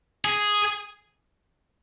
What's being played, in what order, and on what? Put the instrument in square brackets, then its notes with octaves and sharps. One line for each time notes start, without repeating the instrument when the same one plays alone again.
[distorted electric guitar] G#4